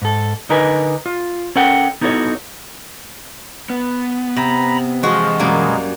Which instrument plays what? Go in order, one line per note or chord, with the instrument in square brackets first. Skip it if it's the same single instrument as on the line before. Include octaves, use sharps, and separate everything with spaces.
[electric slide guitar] G#2 A4
D3 D#4 A#4 B4 G#5
F4
C#4 A4 A#4 F#5 G5
B3 D#4 E4 F#4 A4 C#5
[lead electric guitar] B3
[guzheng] C3 [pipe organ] A#5 B5
[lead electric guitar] E3 D#5 [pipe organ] F3 [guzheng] G#3 F#4
[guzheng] F#2 G3 A#3 [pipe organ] B2 G#3